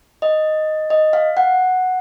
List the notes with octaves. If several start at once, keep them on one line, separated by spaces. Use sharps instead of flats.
D#5
D#5
F5
F#5